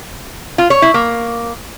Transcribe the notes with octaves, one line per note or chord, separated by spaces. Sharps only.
F4
C#5
E4
A#3